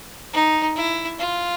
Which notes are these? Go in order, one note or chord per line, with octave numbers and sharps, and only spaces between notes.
D#4
E4
F4